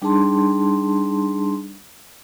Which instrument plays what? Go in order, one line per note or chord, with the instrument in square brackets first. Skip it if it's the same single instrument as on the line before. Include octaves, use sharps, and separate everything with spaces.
[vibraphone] G3 D4 D#4 G#4 A5 C6